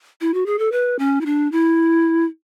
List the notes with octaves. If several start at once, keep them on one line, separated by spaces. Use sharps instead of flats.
E4
F#4
G#4
A4
B4
C#4
E4
D4
E4